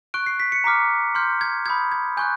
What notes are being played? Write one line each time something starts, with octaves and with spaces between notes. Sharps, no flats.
C#6 F#6 D7
C7
B6
C#7
A#5 D6 F6 B6
C6 F6 G6
G#6
B5 D#6 G6 G#6
G#6
G#5 C#6 F#6 G6